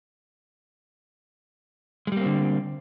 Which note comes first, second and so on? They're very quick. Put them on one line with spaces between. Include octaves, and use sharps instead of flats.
G#3 G3 A#3 C4 D3